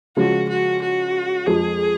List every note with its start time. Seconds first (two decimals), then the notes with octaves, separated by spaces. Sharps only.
0.17 C#3 F3 G#3 C#4 F4 F#4
0.49 F#4
0.82 F#4
1.46 F2 F3 G#3 G#4